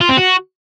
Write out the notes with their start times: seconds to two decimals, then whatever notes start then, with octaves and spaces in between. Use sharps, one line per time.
0.01 F4
0.09 C4
0.17 F#4